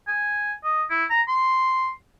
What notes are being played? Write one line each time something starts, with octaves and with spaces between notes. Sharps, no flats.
G#5
D#5
E4
A#5
C6